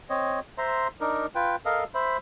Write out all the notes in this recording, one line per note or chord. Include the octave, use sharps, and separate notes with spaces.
C4 C#5 D#5
C5 E5 A#5 C6
D4 D#4 A#4
F4 B4 G5
A4 A#4 D#5 F5
C5 E5 B5